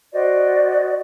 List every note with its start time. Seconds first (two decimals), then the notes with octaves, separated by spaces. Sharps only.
0.13 F#4 C5 D5 D#5